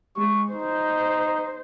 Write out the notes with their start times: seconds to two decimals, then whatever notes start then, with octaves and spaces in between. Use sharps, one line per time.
0.16 G#3 C#6
0.52 D#4 C5